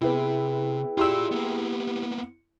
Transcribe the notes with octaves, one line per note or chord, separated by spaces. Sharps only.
C3 B3 E4 G#4 G5
E4 F4 G4 D5 C6 E6
A#3 B3